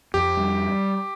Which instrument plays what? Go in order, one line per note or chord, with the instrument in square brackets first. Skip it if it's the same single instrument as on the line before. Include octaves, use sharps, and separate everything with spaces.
[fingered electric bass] F2 [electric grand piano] G4
[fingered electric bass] G3